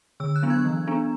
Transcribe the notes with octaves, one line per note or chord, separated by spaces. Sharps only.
D3 E6
F#6
F#3 B3 D4
G#6
E3
B3 D4